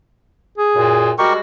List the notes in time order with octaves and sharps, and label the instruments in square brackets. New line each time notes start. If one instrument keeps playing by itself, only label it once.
[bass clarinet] G#4
[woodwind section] F#2 A#2
[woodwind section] G3 G#3 F#4 [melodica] G4 A#4 C#6